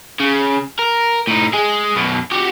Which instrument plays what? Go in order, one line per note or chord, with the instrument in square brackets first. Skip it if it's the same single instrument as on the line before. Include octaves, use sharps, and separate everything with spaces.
[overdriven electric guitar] C#3
A#4
A2 D#4
G#3 G#4
F#2 B2
F#4 G4